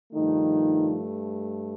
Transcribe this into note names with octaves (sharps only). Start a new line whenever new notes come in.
G2 D#3 F3 A3 D#4